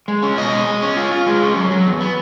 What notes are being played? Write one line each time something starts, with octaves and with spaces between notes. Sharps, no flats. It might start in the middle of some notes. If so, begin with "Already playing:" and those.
G#3
C#4
B2 D#5
G#3
G#3
C#4
F4
F4
G#3
C#4
F#3
F#3
E2
B3